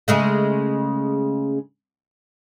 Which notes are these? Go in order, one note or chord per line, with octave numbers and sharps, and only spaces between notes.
C#3 G#3 A3